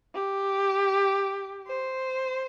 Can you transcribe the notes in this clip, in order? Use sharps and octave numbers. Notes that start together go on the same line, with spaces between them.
G4
C5